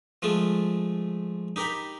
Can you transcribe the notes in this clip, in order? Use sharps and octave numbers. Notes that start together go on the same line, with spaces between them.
F3 G#3 A3 F4
D#4 G4 A#4 A#5 B5